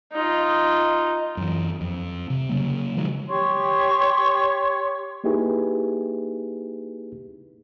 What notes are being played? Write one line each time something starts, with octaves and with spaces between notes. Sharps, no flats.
D#4 F4
F#2 E3
F2
C3
C#3 F#3 A#3
D#3 F3 F#3 G#3
G4 C#5 C6 C#6
A#3 D#4 E4 G4 G#4 B4